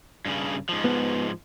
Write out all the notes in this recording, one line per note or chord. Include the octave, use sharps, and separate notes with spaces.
G2 C#3
G#2 F3
B3